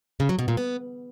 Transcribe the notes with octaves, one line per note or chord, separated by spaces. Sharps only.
C#3
F#3
B2
A#2
B3